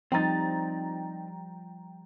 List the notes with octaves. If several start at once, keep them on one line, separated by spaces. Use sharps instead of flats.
F3 G3 C4 D#4 G5 A#5 A6